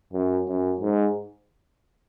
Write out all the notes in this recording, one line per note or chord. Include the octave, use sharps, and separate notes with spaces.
F#2
F#2
G#2